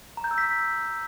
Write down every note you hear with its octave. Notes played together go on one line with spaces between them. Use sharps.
A#5
G6
E6
B6